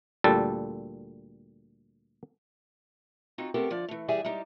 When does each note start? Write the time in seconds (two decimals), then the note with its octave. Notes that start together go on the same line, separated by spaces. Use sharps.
0.24 D2 A#2 G3 A4 A5
3.38 C4 D#4 F4 F#4
3.54 A3 B3 C4 G4 A4 A#4
3.70 D3 F3 D5
3.88 E3 A3
4.08 E3 G3 G#4 E5 G#5
4.24 G3 G#3 D#4 G4